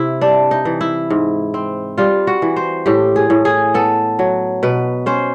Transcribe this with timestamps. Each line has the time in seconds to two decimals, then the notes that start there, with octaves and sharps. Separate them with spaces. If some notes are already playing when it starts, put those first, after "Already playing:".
Already playing: C3 E4
0.21 G3 D4
0.51 D#4
0.65 E3
0.81 E4
1.10 G#2
1.54 C4
1.98 G3 F4
2.27 F#4
2.42 E3
2.56 C5
2.86 A2 G4
3.16 G#4
3.30 A2
3.45 G#4
3.74 B3 A4
4.19 F#3
4.63 B2 B4
5.06 C#4 C5